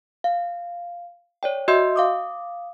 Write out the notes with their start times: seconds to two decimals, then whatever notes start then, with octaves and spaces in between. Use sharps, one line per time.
0.24 F5
1.43 C#5 D5 G5
1.68 F#4 D#5 E5 C6 E6 G6
1.96 F5 D6 D#6